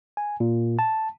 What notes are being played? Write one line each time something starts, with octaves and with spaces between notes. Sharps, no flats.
G#5
A#2
A5